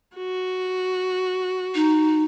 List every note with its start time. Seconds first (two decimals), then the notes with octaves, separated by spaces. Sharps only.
0.17 F#4
1.75 D#4